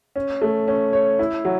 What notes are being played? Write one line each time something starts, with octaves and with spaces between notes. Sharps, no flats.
C#4
A3
C#4
C#5
E4
F#3